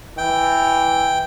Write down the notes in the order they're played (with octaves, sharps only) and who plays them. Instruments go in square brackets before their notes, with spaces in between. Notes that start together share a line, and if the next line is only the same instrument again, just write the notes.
[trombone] E3 [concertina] G5